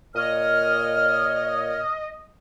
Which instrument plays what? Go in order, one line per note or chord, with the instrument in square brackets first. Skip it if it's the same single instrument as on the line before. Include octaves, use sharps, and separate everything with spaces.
[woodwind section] A#2 C#5 F6 [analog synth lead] D#5